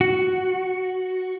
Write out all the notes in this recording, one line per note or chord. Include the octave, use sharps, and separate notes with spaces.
F#4